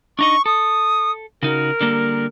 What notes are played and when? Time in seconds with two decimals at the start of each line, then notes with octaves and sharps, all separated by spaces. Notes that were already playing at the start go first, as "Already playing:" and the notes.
0.19 D4 D#4 D#5 C#6
0.46 A4 D#6
1.43 C#3 D#4 F#4 A#4
1.81 D3 G3 A#3